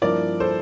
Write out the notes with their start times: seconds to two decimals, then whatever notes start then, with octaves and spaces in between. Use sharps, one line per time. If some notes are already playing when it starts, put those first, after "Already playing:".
0.02 G2 F3 A#3 E4 A#4 D5
0.40 A4 C5